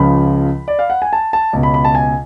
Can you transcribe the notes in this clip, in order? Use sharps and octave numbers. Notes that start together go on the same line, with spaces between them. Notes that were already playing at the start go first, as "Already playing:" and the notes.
Already playing: C#2 C#3 F3 B5
D5
F5
F#5
G#5
A5
A5
C#2 B2
B5
B5
A5
G#5